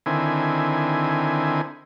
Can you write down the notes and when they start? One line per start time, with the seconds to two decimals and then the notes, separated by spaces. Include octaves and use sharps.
0.06 D3 D#3 C4 E4 G#5